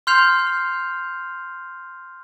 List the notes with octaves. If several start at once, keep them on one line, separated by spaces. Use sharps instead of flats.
C6 F6 G6 C7 F7